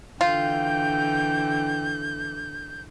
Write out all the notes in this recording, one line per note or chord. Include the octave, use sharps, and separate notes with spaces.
D3 E3 F4 G5 G6